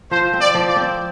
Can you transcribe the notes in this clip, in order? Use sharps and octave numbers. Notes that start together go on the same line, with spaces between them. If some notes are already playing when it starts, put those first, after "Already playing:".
F3 C5
C4
D5
F3
D5
C4